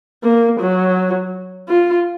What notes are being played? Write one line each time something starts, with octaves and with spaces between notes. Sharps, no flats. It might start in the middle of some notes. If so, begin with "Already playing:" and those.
A#3
F#3
F4